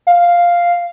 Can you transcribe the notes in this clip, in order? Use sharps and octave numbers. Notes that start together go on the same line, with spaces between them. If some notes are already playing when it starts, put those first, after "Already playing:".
F5